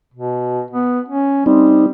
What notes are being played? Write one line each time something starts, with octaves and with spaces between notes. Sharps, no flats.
B2
B3
C#4
G3 C4 D#4